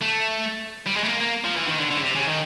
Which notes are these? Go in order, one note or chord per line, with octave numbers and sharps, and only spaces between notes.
A3
G3
G#3
A3
A#3
A#3
F3
E3
D#3
D3
D3
C#3
C3
C#3
D#3